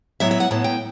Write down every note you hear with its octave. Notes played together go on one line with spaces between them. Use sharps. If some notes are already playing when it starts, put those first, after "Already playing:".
A2 F#3 B3 E5
E5
F#5
A2 F#3 B3 A5
G5